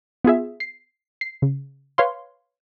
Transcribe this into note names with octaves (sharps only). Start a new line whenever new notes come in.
B3 F4 G#4 E5
C7
C7
C#3
B4 C#5 F5 C6